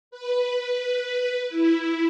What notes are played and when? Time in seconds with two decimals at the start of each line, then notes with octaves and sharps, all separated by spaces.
0.11 B4
1.49 E4